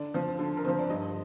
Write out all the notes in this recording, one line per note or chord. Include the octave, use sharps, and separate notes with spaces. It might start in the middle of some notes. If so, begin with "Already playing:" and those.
Already playing: D3 D5
F3 C4
D3
A#4
F3 C4 C5
D5
G2 D#5